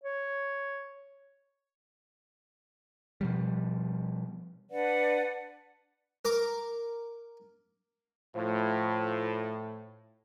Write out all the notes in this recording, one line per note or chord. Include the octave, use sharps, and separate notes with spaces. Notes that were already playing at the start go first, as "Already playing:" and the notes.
C#5
B2 F3 G3
D4 B4 D5 F#5
A#4 D6
A2 F3